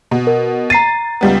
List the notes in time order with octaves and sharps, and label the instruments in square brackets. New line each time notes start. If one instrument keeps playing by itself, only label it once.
[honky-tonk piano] B2
[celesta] A#4
[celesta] A#5 C7 D#7 [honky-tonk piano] A6
[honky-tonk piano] C#2 G3 B3